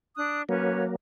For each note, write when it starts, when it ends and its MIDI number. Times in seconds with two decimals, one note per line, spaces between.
0.15 0.40 62
0.15 0.40 87
0.15 0.40 90
0.49 0.96 54
0.49 0.96 58
0.49 0.85 61
0.49 0.85 71
0.49 0.85 73